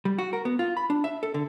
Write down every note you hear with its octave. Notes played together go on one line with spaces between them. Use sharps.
G3
F#4
A#4
B3
F4
B5
D4
E5
A4
D3